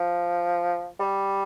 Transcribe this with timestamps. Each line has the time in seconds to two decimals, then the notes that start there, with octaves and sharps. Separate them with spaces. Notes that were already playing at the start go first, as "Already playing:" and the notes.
Already playing: F3
1.00 G3